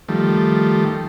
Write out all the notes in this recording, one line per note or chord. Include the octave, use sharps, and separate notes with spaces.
D#3 F3 G3 A3